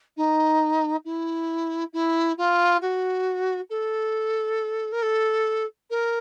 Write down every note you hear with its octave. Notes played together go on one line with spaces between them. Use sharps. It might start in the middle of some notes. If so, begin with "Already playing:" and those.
D#4
E4
E4
F4
F#4
A4
A#4
A4
A#4